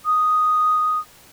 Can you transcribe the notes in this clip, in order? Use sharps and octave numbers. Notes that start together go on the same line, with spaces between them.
D#6